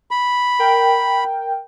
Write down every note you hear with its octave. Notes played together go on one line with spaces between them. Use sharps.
B5
A#4 G5